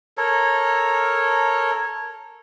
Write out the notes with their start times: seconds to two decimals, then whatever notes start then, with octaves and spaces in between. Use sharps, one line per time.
0.18 A4 A#4 C#5